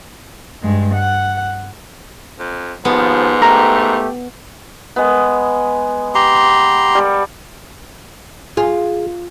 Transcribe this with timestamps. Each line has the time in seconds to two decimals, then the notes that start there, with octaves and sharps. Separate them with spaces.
0.62 G2 G#3
0.94 F#5
2.39 F2
2.85 D#2 G#2 F3 B3
3.42 A3 G4 A#4
4.96 G#3 B3
6.15 G4 A#5 C6
6.95 G3 A4
8.57 F4 G#4